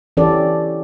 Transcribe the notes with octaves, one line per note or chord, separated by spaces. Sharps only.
E3 C#4 G4 A4 D5